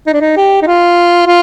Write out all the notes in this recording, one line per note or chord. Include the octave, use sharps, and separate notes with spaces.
D#4
D4
D#4
G4
D#4
F4
F4